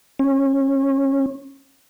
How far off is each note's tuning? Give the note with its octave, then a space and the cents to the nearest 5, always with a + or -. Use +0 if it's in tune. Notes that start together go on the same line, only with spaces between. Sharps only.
C#4 -25